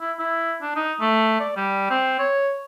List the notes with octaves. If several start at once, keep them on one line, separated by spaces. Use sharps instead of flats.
E4
E4
D4
D#4
A3
D5
G3
C4
C#5